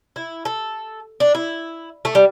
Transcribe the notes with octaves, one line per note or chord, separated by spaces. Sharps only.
E4
A4
D4
E4
A3
G3